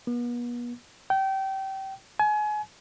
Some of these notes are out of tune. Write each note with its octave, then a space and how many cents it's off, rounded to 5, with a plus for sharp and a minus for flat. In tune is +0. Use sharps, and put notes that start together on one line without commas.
B3 -40
G5 -25
G#5 +30